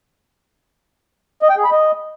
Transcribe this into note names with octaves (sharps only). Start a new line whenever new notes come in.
D#5
G5
G#4
B5
D#5